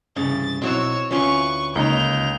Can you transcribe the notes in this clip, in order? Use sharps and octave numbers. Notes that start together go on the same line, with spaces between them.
C2 G2 C#3 A6
B1 F#3 C4 E4 C#5 E6
D2 C#4 F4 B4 C#6
C#2 A#3 D#4 A#5 B5 G6 F7